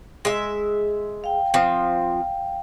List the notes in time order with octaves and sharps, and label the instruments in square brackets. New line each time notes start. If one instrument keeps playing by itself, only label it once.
[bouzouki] G#3 E5
[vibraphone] F5 G5
[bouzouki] F3 C4